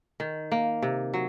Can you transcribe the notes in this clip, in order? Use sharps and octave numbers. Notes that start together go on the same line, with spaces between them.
D#3
A#3
C3
F#3